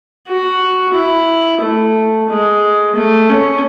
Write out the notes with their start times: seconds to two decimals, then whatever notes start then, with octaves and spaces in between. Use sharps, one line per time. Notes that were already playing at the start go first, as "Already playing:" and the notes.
0.28 F#4
0.94 E4
1.61 A3
2.29 G#3
2.95 A3
3.29 C#4